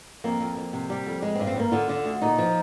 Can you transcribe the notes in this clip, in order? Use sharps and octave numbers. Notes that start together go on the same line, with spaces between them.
F2 A#3
F2
F2
C3
G3
F2
G#3
C4
G2
C4
G2 A#3
D3 F4
D3
D2
A#2 D#4
F3